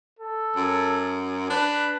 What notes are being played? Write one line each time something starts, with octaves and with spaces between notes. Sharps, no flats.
A4
F#2
D4 B4